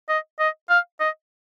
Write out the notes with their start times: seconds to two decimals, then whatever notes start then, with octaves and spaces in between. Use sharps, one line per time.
0.09 D#5
0.40 D#5
0.70 F5
1.00 D#5